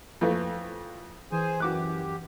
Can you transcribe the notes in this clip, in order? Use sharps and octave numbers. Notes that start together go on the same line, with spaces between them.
F2 E3 A3
E3 G#4 C5 G#5
F#2 F#4 G4 D6 F#6